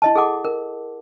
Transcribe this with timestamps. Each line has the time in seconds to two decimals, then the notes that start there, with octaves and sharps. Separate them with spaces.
0.02 E4 D#5 A5
0.15 G#4 A4 F#5 D6
0.45 A#4